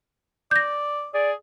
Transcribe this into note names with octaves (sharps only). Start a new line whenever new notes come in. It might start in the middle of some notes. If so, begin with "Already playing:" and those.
D5 G6 A#6
G#4 D5